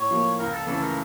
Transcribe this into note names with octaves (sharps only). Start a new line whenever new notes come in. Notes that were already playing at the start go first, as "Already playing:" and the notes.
Already playing: A2 C#5
F3 A#3
C#2 A#4
A4
C#3 E3 A3 A4
A#4